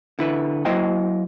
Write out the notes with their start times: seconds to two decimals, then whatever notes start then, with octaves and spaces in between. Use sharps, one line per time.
0.19 D3 E4 B4
0.65 F#3 A#3 E4 C5 D#5 G5